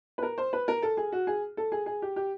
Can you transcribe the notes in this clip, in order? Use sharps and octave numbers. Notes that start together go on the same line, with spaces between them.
B4
A#4
C5
B4
A#4
A4
G#4
F#4
G#4
A4
G#4
G#4
G4
G4